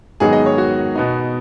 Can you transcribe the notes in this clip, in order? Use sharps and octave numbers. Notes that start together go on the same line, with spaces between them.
G#2 D#3 F#3 B3 D#4 G#4
D#5
C#5
F#4
B2 B3 D#4